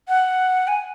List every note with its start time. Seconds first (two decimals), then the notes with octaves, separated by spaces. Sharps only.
0.08 F#5
0.67 G#5